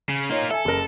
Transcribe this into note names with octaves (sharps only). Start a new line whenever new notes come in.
C#3
A#3 D#4 F4 C#5
A4 E5 G#5
F#1 A#4